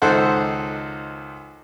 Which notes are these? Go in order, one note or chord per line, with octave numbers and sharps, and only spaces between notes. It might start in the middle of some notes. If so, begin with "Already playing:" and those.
C#2 D#3 A4 C5 F#5